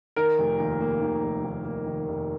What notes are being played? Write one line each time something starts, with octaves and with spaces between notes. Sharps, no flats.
D#3 A#4
F1
D#2
A#3
D#3
F1
D#2
A#3
D#3
F1